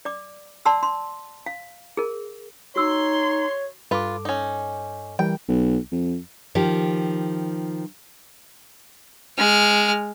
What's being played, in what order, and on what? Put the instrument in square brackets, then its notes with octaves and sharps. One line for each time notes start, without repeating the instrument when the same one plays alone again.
[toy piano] D5 D6
D5 F#5 A5 C6 E6
C6
F5
G#4 A#4
[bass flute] D#4 [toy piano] F#4 E6 [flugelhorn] C#5 [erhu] C6
[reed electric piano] G2 A4 D6 [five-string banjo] F4 B4
[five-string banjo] C#4 D#4
[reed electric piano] E3 G3 A#4 [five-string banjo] G5
[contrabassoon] B1
F2
[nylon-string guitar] D#3 F3 G4
[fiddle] G#3 F6